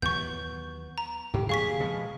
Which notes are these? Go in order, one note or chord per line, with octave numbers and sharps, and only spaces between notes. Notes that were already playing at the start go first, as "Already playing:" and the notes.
D#2 E3 F#3 B3 C#6 G6
A#5
G#2 G4
D3 F3 A#3 G#4 F5 C#6 B6
B2 F3 G#3